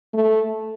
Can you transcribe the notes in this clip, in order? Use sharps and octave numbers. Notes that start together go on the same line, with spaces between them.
A3